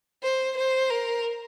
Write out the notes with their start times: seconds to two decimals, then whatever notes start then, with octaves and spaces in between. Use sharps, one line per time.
0.23 C5
0.57 C5
0.90 A#4